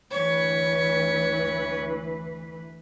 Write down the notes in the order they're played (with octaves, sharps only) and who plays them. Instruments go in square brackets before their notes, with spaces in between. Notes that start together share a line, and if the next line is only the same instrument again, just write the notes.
[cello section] D2 E3 B4 [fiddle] C#5